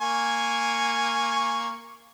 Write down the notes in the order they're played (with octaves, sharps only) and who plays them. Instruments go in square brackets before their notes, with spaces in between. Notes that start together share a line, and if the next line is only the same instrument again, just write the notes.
[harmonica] A#3 G#5 C#6